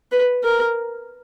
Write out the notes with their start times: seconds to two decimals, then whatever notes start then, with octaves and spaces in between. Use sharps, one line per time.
0.12 B4
0.43 A#4